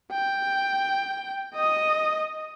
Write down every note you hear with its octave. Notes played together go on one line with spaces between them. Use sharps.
G5
D#5 D#6